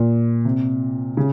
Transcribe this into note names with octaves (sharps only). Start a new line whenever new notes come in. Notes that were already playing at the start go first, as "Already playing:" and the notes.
Already playing: A#2
C3
C#3